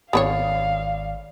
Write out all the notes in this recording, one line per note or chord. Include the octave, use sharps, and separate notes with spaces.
G#1 B3 B4 C#5 D5 F5